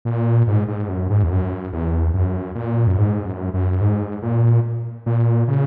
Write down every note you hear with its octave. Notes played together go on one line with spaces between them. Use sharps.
A#2
G#2
G#2
F#2
G#2
E2
F#2
E2
F#2
A#2
F#2
G#2
F#2
F#2
G#2
A#2
A#2
C#3